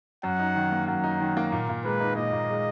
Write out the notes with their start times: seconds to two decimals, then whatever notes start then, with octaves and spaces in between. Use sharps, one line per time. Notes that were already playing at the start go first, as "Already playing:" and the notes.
0.23 F#2 F#5
0.39 D#4
0.55 D#3
0.72 A#3
0.87 F#2 F#5
1.04 D#4
1.20 D#3
1.37 A#3
1.52 A#2
1.69 A#2
1.85 G#3 B4
2.00 D#4
2.17 A#2 D#5
2.32 A#2
2.49 G#3